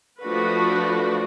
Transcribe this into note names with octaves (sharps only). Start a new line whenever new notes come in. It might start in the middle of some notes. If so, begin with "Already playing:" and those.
F3 A3 D4 F#4 B4